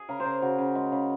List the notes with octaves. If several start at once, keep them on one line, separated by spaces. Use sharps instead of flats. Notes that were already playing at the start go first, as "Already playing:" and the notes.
Already playing: G#4
C#3 A#4
C5
C#3 A#4
C#3 F#4
C#3
G#3
C#3